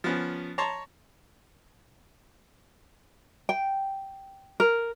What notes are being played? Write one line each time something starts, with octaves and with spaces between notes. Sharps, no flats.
F3 B3 C#4
C#5 A5 A#5 C6 C#6
G5
A#4